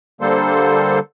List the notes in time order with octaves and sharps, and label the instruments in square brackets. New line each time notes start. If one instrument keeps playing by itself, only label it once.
[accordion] D3 G3 A#3 A4 C5